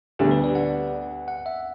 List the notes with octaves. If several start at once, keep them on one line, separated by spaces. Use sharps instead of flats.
D2 D3 G3 B3 D4 G4
B4
D5
F#5
F#5
E5